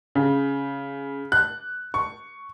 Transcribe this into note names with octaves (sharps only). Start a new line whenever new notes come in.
C#3
F#6
C#6